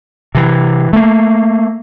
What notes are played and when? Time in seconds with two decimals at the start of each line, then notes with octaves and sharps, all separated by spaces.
0.35 C3 E3
0.93 A3 A#3